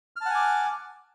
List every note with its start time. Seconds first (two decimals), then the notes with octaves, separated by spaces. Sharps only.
0.16 F6
0.21 A5
0.26 F#5
0.30 G#5
0.35 D6